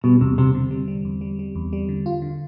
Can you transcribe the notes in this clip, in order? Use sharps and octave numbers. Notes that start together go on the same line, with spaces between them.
B2 G3
E2 C3
C3 C4
D3
G3
G3
E2
G3
G3
E2
G3
D3
F4
D3